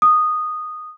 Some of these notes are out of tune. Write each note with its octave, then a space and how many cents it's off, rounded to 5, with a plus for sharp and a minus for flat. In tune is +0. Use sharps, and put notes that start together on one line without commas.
D#6 -10